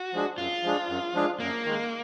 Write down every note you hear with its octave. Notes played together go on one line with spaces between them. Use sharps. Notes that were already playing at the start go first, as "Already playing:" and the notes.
Already playing: F#4
F3 G#3 D4 G#4
F#2 F4
F3 G#3 D4 G#4
F#2
F3 G#3 D4 G#4
F#2 A#3
D#3 G#3